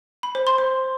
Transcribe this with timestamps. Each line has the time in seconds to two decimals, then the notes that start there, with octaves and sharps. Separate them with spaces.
0.23 B5
0.35 C5
0.47 C6
0.58 C5